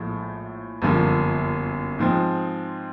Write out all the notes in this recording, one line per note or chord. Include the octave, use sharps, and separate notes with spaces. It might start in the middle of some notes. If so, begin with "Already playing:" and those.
Already playing: A#1 A2 F3 G#3
G1 F#2 D3 F3 A#3
G#2 F3 G#3 C4